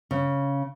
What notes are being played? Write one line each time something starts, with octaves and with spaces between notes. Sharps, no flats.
C#3